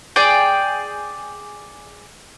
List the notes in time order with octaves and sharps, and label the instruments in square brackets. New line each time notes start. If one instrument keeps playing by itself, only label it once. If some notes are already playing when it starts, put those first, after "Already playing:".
[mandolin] G#4 D5 G5